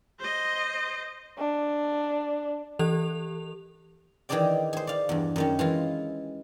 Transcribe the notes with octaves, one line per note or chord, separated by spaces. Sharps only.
C5 D#5
D4
E3 G4 A4 F7
D#3 E3 D#4 G#4 D5 G5
G#4 C5
D5 F5
E2 G2
F#2 D#3 C#4
E3 G#3 F4